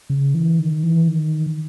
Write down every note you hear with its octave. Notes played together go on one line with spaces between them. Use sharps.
C#3
E3
D#3
E3
D#3